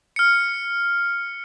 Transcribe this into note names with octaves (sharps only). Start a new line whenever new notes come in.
F6 C#7